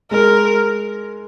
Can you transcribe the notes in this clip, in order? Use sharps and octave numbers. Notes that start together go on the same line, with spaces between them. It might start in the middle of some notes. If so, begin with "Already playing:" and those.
G#3 A#4